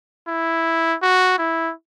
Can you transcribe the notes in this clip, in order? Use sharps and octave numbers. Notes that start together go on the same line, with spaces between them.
E4
F#4
E4